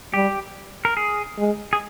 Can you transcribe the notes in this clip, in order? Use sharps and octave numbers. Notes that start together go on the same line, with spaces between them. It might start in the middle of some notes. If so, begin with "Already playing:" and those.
G3 G4
A#4
G#4
G#3
G#4